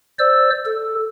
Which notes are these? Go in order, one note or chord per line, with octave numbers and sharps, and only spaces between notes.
C5 D5 E6
A4